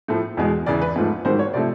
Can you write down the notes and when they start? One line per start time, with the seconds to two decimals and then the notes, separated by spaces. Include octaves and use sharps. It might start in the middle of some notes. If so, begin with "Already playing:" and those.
0.08 A2 F3 A3
0.37 E2 B2 G#3
0.66 E2 C#3 E3 D5
0.81 B4
0.96 G#2 F3 A3
1.25 G#2 D#3 F#3 C5
1.39 C#5
1.53 C3 F3 A3 D5